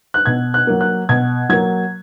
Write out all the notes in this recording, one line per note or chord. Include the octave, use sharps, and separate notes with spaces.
F#6
B2 G#6
F#6
F#3 A#3
F#6
B2 G#6
F#3 A#3 G#6